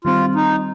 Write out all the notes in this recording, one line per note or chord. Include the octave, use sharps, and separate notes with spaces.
D#3 G3 C4 F4
D#4